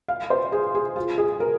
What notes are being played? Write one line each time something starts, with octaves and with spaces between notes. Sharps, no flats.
F5
C5
G#4
G#4
F4
G#4
A#4